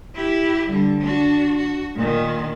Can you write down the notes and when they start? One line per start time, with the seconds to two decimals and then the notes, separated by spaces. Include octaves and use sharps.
0.14 E4 G4
0.69 D3 G3
1.01 D4 F#4
1.57 F#4
1.95 A#2 D#3